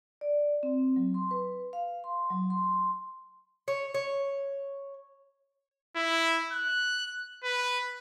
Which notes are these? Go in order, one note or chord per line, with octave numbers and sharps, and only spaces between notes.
D5
C4
F#3
C6
B4
F5
C6
F#3
C6
C#5
C#5
E4
F#6
B4